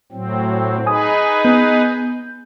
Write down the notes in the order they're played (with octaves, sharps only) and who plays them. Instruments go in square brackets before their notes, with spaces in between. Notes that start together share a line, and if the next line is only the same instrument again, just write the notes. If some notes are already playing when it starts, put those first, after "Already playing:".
[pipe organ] A2 F#3 C4
[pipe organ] D#4 G#4 B4 [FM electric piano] G#5 D#6
[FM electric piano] B3 G6